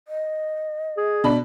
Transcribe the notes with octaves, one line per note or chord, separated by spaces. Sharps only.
D#5
G#4
B2 D4 B5